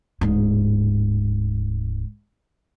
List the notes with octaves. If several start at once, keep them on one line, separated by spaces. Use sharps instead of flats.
D1 G#2